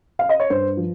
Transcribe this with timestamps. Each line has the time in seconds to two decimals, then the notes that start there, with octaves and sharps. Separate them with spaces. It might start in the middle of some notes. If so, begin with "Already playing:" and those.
0.19 F5
0.29 D#5
0.40 C#5
0.50 G2 C5
0.77 F3